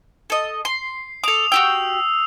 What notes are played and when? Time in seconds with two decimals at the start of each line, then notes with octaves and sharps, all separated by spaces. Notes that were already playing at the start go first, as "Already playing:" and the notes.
0.30 A4 D#5
0.65 C6 C7
1.24 A4 D6 D#6 F7
1.52 F#4 G4 G5 E6